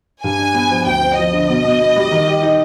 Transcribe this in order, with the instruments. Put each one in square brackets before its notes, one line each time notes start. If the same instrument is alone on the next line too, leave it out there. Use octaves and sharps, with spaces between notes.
[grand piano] G2 [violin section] G#5
[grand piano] D4
B3
F3
[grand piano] D2 [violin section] G5
[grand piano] C4
[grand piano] F3 [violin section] D#5
[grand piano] D3
B2
B2
B3
G3
D#3
G4
D#4